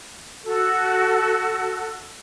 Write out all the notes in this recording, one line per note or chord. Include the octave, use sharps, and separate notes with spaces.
F#4 A4